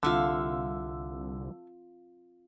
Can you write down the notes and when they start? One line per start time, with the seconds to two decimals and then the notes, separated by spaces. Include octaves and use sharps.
0.03 C2 D3 C4 F4 A4 E5 F5